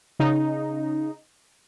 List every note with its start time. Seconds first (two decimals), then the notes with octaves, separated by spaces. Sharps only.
0.19 C#3 D#4